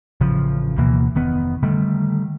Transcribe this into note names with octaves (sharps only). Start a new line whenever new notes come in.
A1 C#3 F3
D2 B2 E3 A#3
F1 D#3 B3
D3 D#3 G3 A3